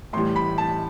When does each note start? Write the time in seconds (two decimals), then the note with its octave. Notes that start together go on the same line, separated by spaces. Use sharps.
0.13 A2 E3 G3 C6
0.36 B5
0.58 A5